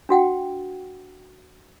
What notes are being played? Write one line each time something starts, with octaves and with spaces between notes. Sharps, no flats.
D4 F#4 F#5 G5